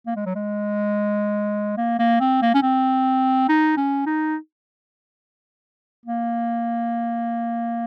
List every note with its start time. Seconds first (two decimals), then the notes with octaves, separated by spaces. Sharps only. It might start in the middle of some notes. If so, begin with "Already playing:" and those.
0.07 A#3
0.16 G#3
0.26 F#3
0.35 G#3
1.77 A#3
1.99 A#3
2.20 C4
2.42 A#3
2.54 C#4
2.62 C4
3.49 D#4
3.77 C#4
4.06 D#4
6.06 A#3